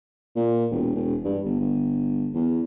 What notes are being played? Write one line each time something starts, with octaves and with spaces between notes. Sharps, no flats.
A#2
E1
E1
G2
G1
G1
E2